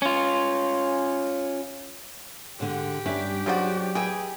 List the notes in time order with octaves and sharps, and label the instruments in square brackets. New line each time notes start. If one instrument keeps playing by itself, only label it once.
[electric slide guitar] C#4 F4
[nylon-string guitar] G#2 D3 [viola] G4
[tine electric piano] G2 G3 [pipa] C#4 [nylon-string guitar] D4 E5
[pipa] C#3 F3 F#4 [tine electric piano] F#3 D5
[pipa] E3 G#4 [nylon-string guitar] G5